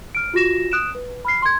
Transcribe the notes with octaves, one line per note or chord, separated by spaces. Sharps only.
F6 D7
F4 F#4 A#6 E7
D#6 F#6 D7 E7
B4
B5 F6 C7
C6 G#6